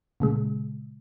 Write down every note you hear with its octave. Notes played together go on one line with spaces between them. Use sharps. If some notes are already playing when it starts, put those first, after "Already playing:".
A#2 C#3 G#3